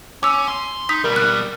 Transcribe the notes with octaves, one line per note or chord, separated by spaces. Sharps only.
C#4 D6 E6
C6
D#4 D#6 B6
B2 G3 A#4
F#6